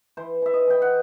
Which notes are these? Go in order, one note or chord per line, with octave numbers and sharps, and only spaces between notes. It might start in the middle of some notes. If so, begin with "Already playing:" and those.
E3 C5
E3 E5
D#5
E3 G5
F#5